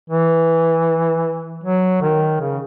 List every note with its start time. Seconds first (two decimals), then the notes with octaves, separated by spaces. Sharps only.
0.10 E3
1.63 F#3
2.02 D#3
2.41 C#3